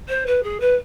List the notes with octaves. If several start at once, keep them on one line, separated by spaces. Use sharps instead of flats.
C5
B4
G#4
B4